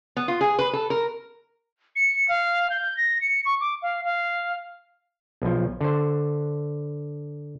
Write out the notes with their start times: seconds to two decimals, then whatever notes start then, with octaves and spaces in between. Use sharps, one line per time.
0.16 B3
0.28 F4
0.41 G#4
0.59 B4
0.73 A4
0.90 A#4
1.96 C#7
2.28 F5
2.70 G6
2.97 A#6
3.21 C#7
3.46 C#6
3.60 D6
3.82 F5
4.04 F5
5.42 B1 F3
5.81 D3 C5